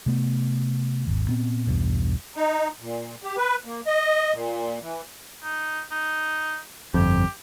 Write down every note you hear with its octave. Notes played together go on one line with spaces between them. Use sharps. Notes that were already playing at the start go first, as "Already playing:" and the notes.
C3 A3 B3
G#1 D#2
A#2 B3 C4
B1 E2 G2 B2
D#4
A#2
G4
B4
A#3
D#5
A#2
E3
D#4
D#4
G1 F2 G4